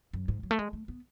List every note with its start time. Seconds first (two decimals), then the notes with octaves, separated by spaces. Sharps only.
0.13 F#2
0.28 G#2
0.43 F#3
0.51 A3
0.59 G#3
0.73 A3
0.88 B3